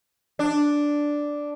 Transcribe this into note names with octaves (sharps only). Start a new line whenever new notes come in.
D4